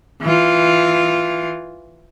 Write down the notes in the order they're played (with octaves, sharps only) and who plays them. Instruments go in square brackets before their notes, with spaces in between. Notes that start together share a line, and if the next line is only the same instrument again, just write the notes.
[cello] E3 F4